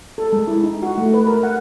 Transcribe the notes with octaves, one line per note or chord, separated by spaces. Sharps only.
A4
G#3
E4
D#4
F#4
A3
B4
A#4
F#5